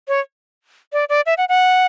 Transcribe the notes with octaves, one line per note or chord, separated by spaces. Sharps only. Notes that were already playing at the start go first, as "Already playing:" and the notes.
C#5
D5
D5
E5
F#5
F#5